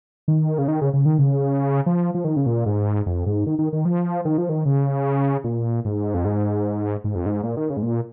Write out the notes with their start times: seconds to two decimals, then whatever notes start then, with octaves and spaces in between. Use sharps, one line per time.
0.28 D#3
0.58 C#3
0.68 D#3
0.81 C#3
0.94 C#3
1.05 D#3
1.19 C#3
1.86 F3
2.15 F3
2.24 D#3
2.36 C#3
2.46 A#2
2.66 G#2
3.06 F2
3.26 G#2
3.47 D#3
3.59 D#3
3.73 D#3
3.85 F3
4.25 D#3
4.38 F3
4.49 D#3
4.66 C#3
5.44 A#2
5.85 G#2
6.14 F2
6.25 G#2
7.04 G#2
7.15 F2
7.26 G#2
7.43 A#2
7.57 D#3
7.70 C#3
7.77 G#2
7.83 A#2